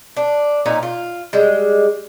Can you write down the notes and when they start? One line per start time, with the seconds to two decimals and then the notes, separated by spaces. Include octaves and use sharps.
0.16 D4
0.66 A#2 C#4 D#4
0.83 F4
1.33 G3 G#3